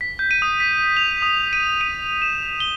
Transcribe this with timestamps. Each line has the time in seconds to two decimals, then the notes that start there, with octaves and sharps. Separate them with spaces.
0.01 B6
0.19 G6
0.31 D#7
0.42 D#6
0.60 B6
0.97 F7
1.22 D#6
1.53 D#7
1.81 D#7
2.22 E7
2.60 G7